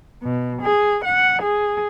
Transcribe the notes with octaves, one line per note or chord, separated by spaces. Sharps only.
B2
G#4
F#5
G#4